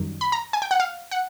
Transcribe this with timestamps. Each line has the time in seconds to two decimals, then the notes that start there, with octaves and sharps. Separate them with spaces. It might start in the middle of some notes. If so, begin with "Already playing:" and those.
Already playing: F#2 D#3 G3
0.21 B5
0.32 A#5
0.53 G#5
0.62 G5
0.71 F#5
0.80 F5
1.11 F#5